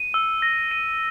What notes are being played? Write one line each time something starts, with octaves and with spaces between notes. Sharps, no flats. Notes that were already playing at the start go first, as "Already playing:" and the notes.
Already playing: D#7
E6
A#6
D#7